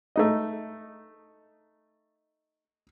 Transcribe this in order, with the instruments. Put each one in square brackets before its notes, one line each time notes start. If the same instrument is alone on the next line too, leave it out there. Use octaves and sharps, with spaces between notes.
[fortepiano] A3 D#4 D#5